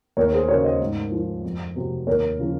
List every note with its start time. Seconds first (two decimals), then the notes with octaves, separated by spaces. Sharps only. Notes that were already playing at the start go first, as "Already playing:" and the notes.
0.17 D#2 A#4 C#5
0.32 G#4 C5
0.48 C#3 F#3 A#4 C#5
0.64 C5 D#5
0.80 G#2
1.12 F3
1.44 F2
1.76 C3 F#3
2.07 D#2 A#4 C#5
2.39 C#3 F3